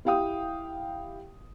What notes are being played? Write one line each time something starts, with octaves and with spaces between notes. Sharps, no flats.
E4 G4 F5 G5 D#6